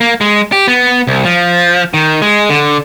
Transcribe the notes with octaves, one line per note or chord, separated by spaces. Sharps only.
A#3
G#3
G4
B3
C2
F3
D#3
G#3
D3